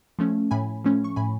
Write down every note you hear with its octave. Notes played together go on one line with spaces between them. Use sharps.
F3 A3 C#4
A2 G#5 B5
F3 A3 C#4
C#6
A2 G#5 B5